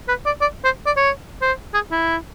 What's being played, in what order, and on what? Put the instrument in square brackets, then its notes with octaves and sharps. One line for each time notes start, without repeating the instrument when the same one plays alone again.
[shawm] B4
D5
D5
C5
D5
C#5
C5
G#4
E4